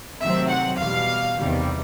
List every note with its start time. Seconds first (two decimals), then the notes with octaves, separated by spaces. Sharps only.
0.21 C3 D#3 F#3 A3 C4 E5
0.49 F#5
0.78 E2 B2 G3 F5
1.35 E2 C3 D#3 G3